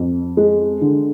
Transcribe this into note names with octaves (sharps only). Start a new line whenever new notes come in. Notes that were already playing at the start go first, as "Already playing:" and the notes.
Already playing: F2
G#3
D3